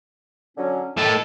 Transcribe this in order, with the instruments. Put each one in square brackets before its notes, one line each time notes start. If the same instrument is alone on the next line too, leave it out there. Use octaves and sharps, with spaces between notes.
[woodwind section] D3 F#3 C#4
[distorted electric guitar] A2 A4 [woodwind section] D#3